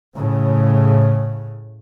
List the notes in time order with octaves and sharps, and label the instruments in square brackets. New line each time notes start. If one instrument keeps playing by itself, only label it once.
[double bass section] A2 C#3